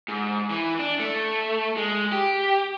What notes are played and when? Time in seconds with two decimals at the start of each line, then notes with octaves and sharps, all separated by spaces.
0.08 G#2
0.50 E3
0.79 D4
0.99 A3
1.77 G#3
2.12 G4